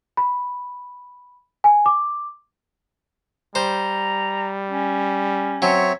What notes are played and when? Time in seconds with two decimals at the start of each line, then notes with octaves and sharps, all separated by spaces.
0.17 B5
1.64 G#5
1.86 D6
3.55 G3 C5 A#5
4.71 C#4
5.62 F#3 C4 C#5 E5